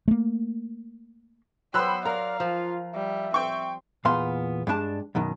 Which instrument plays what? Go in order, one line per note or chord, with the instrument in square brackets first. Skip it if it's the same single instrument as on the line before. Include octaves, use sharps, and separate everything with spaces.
[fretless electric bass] A3 A#3
[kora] F#3 B3 [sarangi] C5 [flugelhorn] G5 [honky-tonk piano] B5 E6 F#6
[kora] A#4 [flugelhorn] D5 [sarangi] F5 [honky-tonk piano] A#5
[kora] F3 [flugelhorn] F4
[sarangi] G3 [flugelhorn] E5
[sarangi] C4 [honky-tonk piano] G5 C#6
[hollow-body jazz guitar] E2 A#2 B3 F5 C6
G2 G#3 D4 A5
F#2 B2 D#3